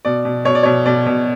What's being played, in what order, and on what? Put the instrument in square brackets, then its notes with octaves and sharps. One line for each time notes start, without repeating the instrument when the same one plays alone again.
[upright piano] B2 D5
B2
B2 C#5
D5
B2 C#5
B2 D5
B2